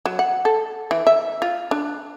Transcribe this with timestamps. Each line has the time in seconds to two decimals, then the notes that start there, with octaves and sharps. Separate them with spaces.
0.06 F#3
0.19 F#5
0.45 A4
0.91 E3
1.07 E5
1.42 F4
1.71 D4